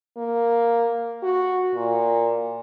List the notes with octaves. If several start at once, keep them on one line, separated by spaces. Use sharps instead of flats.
A#3
F#4
A#2